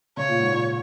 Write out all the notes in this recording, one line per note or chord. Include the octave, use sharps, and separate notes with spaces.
C#3 C#5
A#2
G#2
A#2